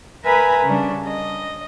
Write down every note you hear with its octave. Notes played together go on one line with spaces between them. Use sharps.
A#4 B4 E5 G#5 A#5 B5
C#3 G3 D4
D#5